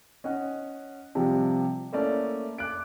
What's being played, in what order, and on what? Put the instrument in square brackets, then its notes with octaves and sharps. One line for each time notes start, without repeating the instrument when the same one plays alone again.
[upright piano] C#4 D#5 F#5
C3 F3 G3
A3 A#3 C#4 E4 D5
D6 F#6 D7